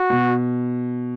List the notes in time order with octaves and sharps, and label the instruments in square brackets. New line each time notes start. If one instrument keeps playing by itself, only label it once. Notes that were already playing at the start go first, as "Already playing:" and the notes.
Already playing: [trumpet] F#4
[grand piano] B2